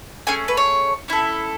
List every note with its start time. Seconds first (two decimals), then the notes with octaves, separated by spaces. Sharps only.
0.27 A3 C#4 G#4 G#5
0.48 B4
0.57 C#5
1.08 C#4 E4 A4